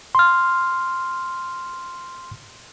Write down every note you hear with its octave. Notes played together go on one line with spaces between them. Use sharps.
C6 F6